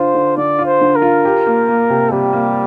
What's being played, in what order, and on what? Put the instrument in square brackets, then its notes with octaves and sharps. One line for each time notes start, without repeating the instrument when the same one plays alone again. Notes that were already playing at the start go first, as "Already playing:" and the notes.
Already playing: [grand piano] D3 D4 F4 [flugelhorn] C5
[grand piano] D3
[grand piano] D3 [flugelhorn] D5
[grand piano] F4
[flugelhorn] C5
[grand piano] D3
[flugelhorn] A#4
[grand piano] F4
G4
A#3
A#3
C3
[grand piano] C3 [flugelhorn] G3
[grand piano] A#3